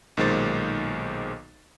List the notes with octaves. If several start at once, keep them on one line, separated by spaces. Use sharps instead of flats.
B1 A#2 D#3 G#3 C5 A6